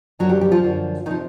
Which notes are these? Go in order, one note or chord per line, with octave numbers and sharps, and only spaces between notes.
F#2 D3 F3 F#3 F#4
G3 G4
G3 G4
F3 F4
F#2 D3 F3
C3 D#3 F3 D#4